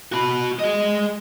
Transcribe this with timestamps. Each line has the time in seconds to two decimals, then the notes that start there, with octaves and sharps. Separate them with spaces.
0.12 F#4 B5
0.59 G#4 D#5